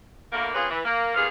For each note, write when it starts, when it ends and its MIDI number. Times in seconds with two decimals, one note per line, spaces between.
0.32 0.50 47
0.32 0.50 50
0.32 0.50 57
0.32 0.50 58
0.54 0.68 58
0.54 0.68 60
0.54 0.68 61
0.54 0.68 65
0.54 0.68 68
0.54 0.68 71
0.70 0.80 52
0.84 1.14 58
1.15 1.26 39
1.15 1.26 46
1.15 1.26 59
1.15 1.26 68
1.15 1.26 77